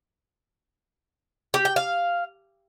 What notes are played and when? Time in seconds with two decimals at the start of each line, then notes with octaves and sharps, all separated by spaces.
1.54 G4
1.65 G5
1.76 F5